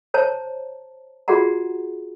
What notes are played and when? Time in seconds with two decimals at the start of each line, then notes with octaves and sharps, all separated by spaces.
0.14 C5 C#5 A5 A#5
1.28 F4 F#4 G#4 D5 F#5 A#5